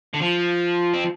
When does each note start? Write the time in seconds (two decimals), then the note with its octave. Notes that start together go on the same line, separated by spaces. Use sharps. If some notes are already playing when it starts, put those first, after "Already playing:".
0.14 D3
0.22 F3
0.94 C4